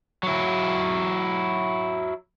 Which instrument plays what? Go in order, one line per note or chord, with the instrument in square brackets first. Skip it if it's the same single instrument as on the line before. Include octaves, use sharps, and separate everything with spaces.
[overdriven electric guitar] F#3 E4